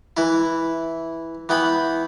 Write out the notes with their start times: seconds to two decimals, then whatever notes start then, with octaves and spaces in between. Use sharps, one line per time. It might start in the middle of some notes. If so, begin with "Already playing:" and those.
0.17 E3 E4
1.49 E3 B3 G5 B5